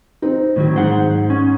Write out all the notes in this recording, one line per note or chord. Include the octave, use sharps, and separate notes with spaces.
C4 D#4
A2 D#3 F#3
G#2 C5 F#5
C#4